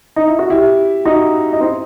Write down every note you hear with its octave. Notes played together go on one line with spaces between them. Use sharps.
D#4
E4
F#4
E4 G4
D#4 F#4
D#4
C4 E4